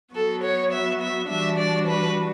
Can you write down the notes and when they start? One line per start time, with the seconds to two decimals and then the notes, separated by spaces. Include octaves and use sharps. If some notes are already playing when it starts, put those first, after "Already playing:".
0.15 F#3 B3 F#4 A4
0.44 C#5
0.73 E5
1.01 E5
1.29 E3 G3 D4 F#4 E5
1.58 D5
1.87 B4